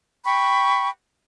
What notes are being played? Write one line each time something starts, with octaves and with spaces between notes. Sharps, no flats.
G5 B5 C#6